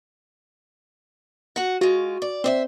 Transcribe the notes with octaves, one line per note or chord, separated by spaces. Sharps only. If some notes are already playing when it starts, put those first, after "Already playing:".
F#4 F#5
G#3 F4 F#4
D5
C4 C5 D5 E5